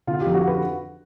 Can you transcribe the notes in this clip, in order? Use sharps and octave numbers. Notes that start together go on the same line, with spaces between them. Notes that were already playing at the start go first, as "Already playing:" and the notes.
D3 F4
F2 G4
F#4
B4